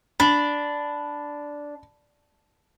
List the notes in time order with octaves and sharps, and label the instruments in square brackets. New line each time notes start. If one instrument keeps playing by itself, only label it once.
[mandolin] D4 [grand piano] B5